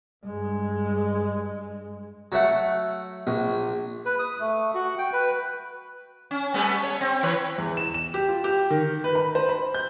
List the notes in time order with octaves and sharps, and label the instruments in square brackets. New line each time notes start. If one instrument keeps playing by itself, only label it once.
[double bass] G2 G#3
[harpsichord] F#3 A3 F#5
A#1
[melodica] B4
D#6
A3
F#4
G5
B4
[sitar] C#4
G3 A3 B3
C#5
C4
E3 B4 C#5
[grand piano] E2
E7
E7
G4
F4
G4
D#3
B4
B5
C5
B5
G6